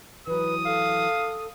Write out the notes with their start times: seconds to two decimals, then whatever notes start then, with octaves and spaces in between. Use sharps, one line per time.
0.27 E3 F#3 B4 D#6
0.66 A4 F5